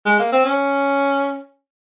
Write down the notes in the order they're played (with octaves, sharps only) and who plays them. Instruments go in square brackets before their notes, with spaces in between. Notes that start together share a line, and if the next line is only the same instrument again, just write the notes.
[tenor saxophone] G#3
A#3
C4
C#4